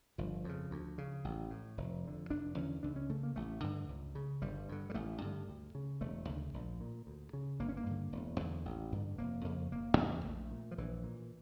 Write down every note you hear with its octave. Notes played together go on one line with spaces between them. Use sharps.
G1 F3
F2 C#3
D2
C#3
A1
A2
F1
F2 D3
F1 D4
E2 D3 C#4
C#2 D4
C#4
C#3 A3
A#3
A1 A3
G2 D3
C#2
C#3
G1 G3
G2 D3
G3
A1 A3
G2 D3
D2
C#3
E1 A3
D2 C#3
A#1
A#2
D2
C#3
G1 A#3
C#4
A#3
G2 D3
E1
E2 D3
A1
G2 D3
F1 A#3
F2 C#3 A#3
E1 A#3
E2 C#3
A#1 A3
A#2
F3
A#1 E3
A#2